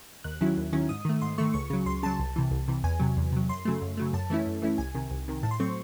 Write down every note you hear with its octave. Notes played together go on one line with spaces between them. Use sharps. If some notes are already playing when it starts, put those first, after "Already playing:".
D#2 F#6
D#3 F#3 C#4 E4
D#2
D#3 F#3 C#4 E4
G#2 D#6
D#3 A3
G#2 C6
D#3 A3 C#6
C#2 C#6
C#3 F#3
C#2 C6
C#3 F#3 A5
C2
C3 E3
C2
C3 E3
E2 G#5
C3 F#3
E2
C3 F#3
F#2 C6
C#3 F#3 A3
F#2
C#3 F#3 A3
F#2 A5
E3 A3 C#4 E4
F#2
E3 A3 C#4 E4
C2 G#5
C3 D#3
C2
C3 D#3
A2 A5
C6
F#3 A3 C4 C#6